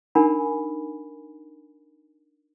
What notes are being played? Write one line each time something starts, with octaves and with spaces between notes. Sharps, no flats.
D4 D#4 A#4 F#5 G#5 B5